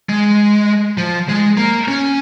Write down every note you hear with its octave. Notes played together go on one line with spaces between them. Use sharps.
G#3
F3
G#3
A#3
C#4